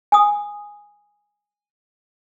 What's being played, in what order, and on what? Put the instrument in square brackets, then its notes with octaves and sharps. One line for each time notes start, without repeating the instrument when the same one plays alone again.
[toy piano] G#5 D#6